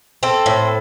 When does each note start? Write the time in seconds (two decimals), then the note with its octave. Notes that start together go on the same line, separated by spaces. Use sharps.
0.23 C4 A4
0.46 A2